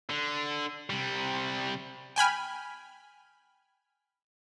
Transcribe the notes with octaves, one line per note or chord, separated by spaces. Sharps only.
D3
C3 G3
G5 G#5 B5 F6